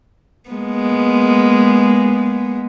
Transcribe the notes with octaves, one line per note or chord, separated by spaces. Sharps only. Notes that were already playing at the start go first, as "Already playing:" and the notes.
G#3 A#3 B3